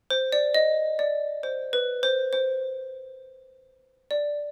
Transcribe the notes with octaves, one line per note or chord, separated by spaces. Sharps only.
C5
D5
D#5
D5
C5
B4
C5
C5
D5